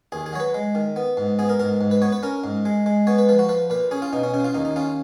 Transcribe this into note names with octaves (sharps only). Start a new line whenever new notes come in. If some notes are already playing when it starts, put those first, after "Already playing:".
D#2 G#4
G#4
F#3 C#5
B4
G#3
D#3
B3
G#2
B3 G#4
A#4
G#2 A#4
G#2
B4
B3 C#5
B4
C#4 A#4
G#2
G#3
G#3
B3 C#5
B4
F3 B4
F#4
F3 B4
A#2 B4
C#4 G#4
F4
B2 D#4
C#4
C#3 C#4
F4
D#2 D#4
D#4
C#4 F4